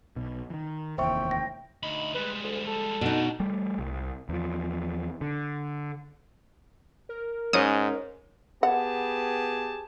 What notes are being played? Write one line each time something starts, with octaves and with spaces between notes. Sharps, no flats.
B1 B2
D#3 E3
F1 D#2 E3 C5 E5 G5 C#6
A#6
D2 D#4 B5
G3 G#3 B4
D2
A4
B2 B3 D4 D#4
G3 A3
C2
E2 F3
D3
A#4
G#2 C#4 D#5 D#6
B3 G4 G#4 F#5 A5